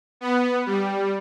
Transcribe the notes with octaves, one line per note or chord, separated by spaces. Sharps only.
B3
G3